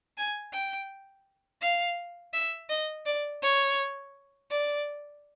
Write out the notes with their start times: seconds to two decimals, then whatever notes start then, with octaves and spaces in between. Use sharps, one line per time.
0.18 G#5
0.53 G5
1.62 F5
2.33 E5
2.69 D#5
3.06 D5
3.42 C#5
4.50 D5